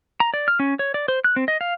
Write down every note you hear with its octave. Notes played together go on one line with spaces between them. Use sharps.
A#5
D5
F6
C#4
C#5
D5
C5
F#6
C4
D#5
F5